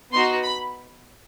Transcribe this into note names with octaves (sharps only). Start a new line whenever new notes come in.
B3 D#4 F#4 C6
B5